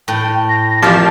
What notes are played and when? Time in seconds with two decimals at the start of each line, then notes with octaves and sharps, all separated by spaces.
0.08 A2 G5
0.49 A#6
0.82 A1 F3 G4 A#4 C#5 A5 F6